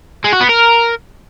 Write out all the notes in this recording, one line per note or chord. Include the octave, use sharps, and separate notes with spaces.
G#3
F#4
B3
A#4